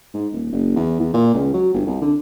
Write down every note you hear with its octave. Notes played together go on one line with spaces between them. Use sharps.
G#2
D#1
F#1
E2
E2
A#2
C#2
F#3
G1
C2
D3